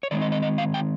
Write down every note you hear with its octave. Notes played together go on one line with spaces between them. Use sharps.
C#5
D#3 G#3 C4 D5
D#5
D#5
D#5
F5
G5